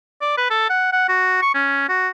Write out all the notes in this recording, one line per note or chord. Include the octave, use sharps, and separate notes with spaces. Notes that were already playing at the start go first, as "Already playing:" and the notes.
D5
B4
A4
F#5
F#5
F#4
C#6
C#4
F#4